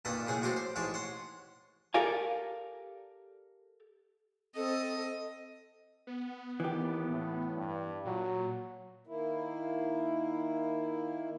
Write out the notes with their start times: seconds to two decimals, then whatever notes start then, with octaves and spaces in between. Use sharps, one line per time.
0.05 G2 A#2 D#3 A4 B4 D#6
0.27 C#2 A2 G#4 F#5 G#5
0.42 F#3 G#3 F#4 G4 A4 C5
0.56 C5
0.76 A1 G#2 G#3 C#5 A5 D6
0.94 C#5 F#5 C6
1.94 G4 A4 A#4 D5 F5 G#5
4.56 C4 A4 D#5
6.07 B3
6.60 D#2 E3 G4
7.08 A2
7.56 G2
8.05 A#2 F#3
9.07 D#3 A#3 E4